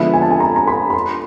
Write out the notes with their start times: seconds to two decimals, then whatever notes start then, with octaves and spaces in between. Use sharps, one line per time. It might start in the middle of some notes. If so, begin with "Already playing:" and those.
Already playing: D3 F3 G#3 B3 E5
0.13 G#5
0.22 A5
0.30 G#5
0.40 A#5
0.56 A#5
0.67 B5
0.90 B5
0.94 C6